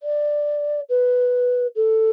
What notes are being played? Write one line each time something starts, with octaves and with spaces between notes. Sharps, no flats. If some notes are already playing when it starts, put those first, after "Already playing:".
D5
B4
A4